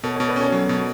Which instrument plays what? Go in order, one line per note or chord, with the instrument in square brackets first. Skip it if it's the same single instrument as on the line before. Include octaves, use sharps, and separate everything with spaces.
[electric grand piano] B2 [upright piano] A4 C#5
[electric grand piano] B2 [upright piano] A4 C#5
[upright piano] B4 D5
[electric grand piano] C#4 [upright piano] A4 C#5
[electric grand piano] F#3
B2